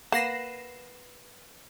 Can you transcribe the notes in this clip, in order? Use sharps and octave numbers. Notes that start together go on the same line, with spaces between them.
A#3 B4 F#5 A#6 C7 E7